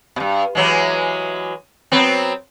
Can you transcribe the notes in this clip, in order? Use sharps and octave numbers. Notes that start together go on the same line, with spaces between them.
G2 B2
E3 F#3 G#3
F#3 B3 C4